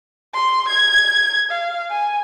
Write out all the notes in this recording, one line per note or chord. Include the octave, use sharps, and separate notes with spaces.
C6
G#6
F5
G#5